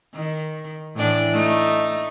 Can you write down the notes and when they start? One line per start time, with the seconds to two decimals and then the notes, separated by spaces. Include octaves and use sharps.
0.15 D#3
0.96 A2 E3 D4
1.33 A3 D#4